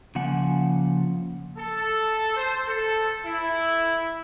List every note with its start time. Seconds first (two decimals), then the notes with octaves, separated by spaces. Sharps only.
0.15 C#3 F3 A#3 F#5 G#5
1.58 A4
2.37 C5
2.68 A4
3.25 E4